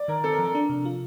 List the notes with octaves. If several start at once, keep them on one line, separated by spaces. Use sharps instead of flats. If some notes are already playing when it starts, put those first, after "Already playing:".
Already playing: D5
D#3 A#4
C4 A4
A#4
F3
A#4
D4
C3
F4